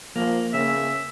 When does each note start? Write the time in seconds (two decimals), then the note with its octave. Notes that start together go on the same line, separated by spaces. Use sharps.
0.16 F3 A#3
0.54 C#3 E5